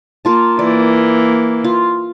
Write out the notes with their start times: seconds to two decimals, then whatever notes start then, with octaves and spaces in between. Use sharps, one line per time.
0.25 A#3 F4 A5
0.59 E3 A#3 D5
1.64 F4